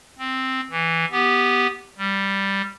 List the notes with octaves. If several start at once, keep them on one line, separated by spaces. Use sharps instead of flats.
C4
E3
B3 G4
G3